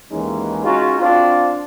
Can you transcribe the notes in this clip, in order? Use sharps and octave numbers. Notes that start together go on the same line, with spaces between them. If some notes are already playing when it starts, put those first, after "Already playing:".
D#2 E3 G#3 C#4 D#4
G#3 C#4 D#4 F4 F#4
C4 D4 F4